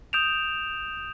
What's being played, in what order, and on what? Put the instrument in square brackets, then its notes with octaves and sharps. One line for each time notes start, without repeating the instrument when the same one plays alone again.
[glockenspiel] D#6 G6 D7 E7 F7